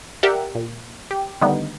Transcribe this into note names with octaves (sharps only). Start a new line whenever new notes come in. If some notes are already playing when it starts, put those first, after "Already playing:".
G4 A#4 D5 E5 F#5
A#2
G4
D3 D#3 G3 A3 B3 D#4